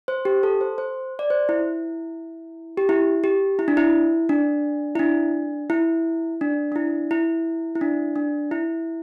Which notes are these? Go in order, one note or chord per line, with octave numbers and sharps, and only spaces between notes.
C5
G4
A4
C5
C5
D5
C5
E4
G4
E4
G4
E4
D4
E4
D4
E4
D4
E4
D4
D4
E4
E4
E4
D4
D4
E4